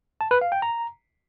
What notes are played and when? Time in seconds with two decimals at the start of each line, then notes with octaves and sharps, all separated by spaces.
0.21 A5
0.31 B4
0.41 F5
0.52 G5
0.62 A#5